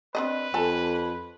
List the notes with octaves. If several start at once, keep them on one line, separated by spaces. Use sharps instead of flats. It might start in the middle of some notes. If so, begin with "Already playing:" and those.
C4 D4 B4 D#5
F2 A4 G#5